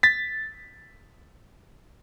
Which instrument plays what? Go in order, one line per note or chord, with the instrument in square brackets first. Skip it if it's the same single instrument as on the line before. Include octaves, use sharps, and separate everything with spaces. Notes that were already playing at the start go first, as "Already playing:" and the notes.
[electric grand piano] A6 B6